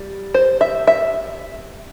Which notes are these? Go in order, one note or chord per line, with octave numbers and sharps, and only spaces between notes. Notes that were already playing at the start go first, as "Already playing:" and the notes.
Already playing: G3
C5
E5
E5